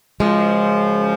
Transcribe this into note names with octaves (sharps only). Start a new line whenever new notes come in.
F#2 C#3 F3 G#3